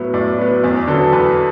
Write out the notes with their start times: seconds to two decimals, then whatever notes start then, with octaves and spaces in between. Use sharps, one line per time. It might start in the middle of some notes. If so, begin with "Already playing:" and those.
Already playing: A2 F#3 B3 E5
0.14 A2 D5
0.38 F#3 B3 B4
0.64 E2 D5
0.87 D3 F#3 B3 A4
1.13 E2 B4